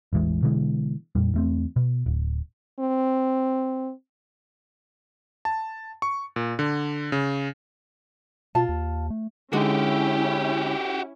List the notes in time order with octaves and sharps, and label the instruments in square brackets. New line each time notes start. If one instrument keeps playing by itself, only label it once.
[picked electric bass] A1 E2 E3 G#3
B2 D3 E3 G#3
F2 A#2 G3
E2 A3 C4
B2
D1
[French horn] C4
[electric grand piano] A5
C#6
A#2
D3
C#3
[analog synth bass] B2 [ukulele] F4 A5
[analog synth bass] D#2
A3
[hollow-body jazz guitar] D3 G#3 D#4 [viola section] C#4 E4 [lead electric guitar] F#4 G4